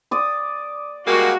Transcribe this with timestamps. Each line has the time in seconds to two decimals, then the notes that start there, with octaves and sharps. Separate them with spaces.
0.11 D5 D#6
1.07 G3 G#3 A#3 F#4